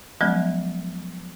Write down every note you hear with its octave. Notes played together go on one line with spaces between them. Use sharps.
F3 F#3 G#3 B3 C#4